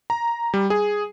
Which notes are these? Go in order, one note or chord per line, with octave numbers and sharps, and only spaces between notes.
A#5
G3
G#4